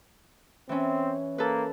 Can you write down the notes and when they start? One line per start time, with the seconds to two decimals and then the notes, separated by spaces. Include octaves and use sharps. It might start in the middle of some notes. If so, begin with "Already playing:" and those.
0.69 E3 C4 C#4
1.38 A#3 A4 B4